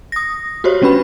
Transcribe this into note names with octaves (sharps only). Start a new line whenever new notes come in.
D#6 A#6
F#4 G4 C5 C#5
G3 C#4 D4 B4 B5